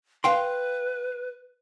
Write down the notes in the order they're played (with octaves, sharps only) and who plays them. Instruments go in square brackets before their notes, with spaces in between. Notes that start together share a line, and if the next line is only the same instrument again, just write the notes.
[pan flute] B4 [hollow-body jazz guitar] F5 G5 C6